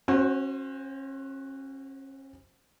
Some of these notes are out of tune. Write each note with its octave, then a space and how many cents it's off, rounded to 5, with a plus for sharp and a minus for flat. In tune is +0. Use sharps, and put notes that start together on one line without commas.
C#4 -35 F#4 +0 C5 +5